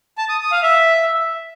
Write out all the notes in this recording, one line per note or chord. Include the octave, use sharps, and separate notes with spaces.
A5
D#6
D#6
F5
E5